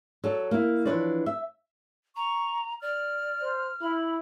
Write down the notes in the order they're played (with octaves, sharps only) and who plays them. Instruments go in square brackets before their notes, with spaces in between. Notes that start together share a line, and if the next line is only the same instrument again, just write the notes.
[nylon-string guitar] F#3 A4 D5
A#3 E4
E3 F3 D4 B4 C#5 D5
E5
[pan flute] A#5 [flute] C#6
[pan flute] D5 [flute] F6
[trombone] C5
[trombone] E4 [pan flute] B5